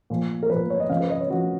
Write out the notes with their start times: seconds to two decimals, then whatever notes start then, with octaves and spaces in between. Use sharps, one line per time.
0.10 A#2 F3
0.43 A#4
0.50 A#2 F3 B4
0.70 C#5
0.80 D#5
0.90 C#3 F3 F5
1.00 B4
1.10 D#5
1.20 C#5
1.30 C#3 F3 F#4